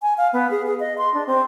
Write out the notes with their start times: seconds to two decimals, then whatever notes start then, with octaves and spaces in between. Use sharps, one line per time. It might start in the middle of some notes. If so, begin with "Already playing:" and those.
0.02 G#5
0.18 F5
0.33 B3
0.51 G#4
0.66 G#4
0.80 D#5
0.98 C6
1.14 D4
1.27 C4